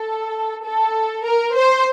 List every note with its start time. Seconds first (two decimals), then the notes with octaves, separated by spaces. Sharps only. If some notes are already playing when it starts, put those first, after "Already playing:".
Already playing: A4
0.64 A4
1.24 A#4
1.56 C5